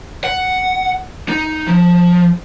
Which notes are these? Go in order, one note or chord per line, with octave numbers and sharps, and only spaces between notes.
F#5
D#4
F3